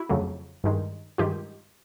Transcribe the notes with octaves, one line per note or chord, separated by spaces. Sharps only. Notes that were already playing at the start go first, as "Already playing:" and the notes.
Already playing: E4 F#4
F2 C#3 F#3 A3
G2 D#3 G#3
G2 D#3 G#3 F4 G4